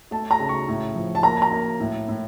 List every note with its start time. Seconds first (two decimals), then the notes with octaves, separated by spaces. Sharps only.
0.11 A3 A5
0.31 A#5
0.39 C#3
0.49 C#6
0.68 A2
0.95 F3
1.15 A5
1.23 A#3 A#5
1.42 A#5
1.51 A#3
1.80 A2
2.08 A2